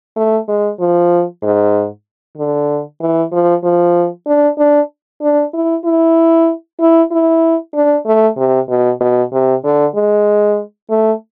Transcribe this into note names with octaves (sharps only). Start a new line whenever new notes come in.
A3
G#3
F3
G#2
D3
E3
F3
F3
D4
D4
D4
E4
E4
E4
E4
D4
A3
C3
B2
B2
C3
D3
G#3
A3